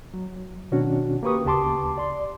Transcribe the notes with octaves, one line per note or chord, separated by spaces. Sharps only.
F#3
B2 D#3 C#4 D4 F#4
A#3 G4 B4 C#6 D#6
D2 C#3 G4 A5 C6 D6
D5 C6